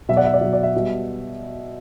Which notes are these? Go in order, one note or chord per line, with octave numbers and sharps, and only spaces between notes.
B2 F#3 E5
D5 F#5
E5
D5
B2 F#3 E5
D5
E5
B2 G3